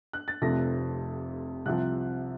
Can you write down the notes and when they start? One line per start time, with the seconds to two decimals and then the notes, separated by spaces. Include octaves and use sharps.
0.13 F#6
0.28 A6
0.42 F1 F2 C3 F3 A3 A#6
1.65 C2 C3 F3 F#6